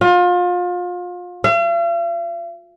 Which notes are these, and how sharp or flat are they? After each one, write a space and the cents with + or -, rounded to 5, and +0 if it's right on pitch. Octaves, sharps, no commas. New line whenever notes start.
F4 +30
F5 -45